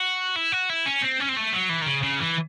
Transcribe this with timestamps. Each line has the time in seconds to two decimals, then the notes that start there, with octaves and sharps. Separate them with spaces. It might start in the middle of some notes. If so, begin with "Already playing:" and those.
Already playing: F#4
0.36 E4
0.52 F#4
0.70 E4
0.86 C#4
1.02 C4
1.20 C#4
1.28 C4
1.36 A3
1.53 F#3
1.69 E3
1.82 D#3
1.86 C#3
2.03 C#3
2.20 E3